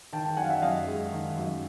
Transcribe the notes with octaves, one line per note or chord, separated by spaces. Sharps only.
D#3 G5 A5
G5 A5
F#2 F#5 G#5
F5
E5 F#5
F#2 D#5 F5
G#3
D#3
F#2